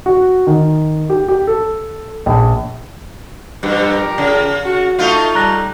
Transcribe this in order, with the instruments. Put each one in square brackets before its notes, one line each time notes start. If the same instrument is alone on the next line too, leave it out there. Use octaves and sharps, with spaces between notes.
[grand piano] F#4
D#3
G4
G4
A4
A#1
[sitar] G2 [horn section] F3 G4 A#4
[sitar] C#3
[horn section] F#4
[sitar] A3 D#4 F4
[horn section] G3 [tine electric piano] A#5 F#6 A#6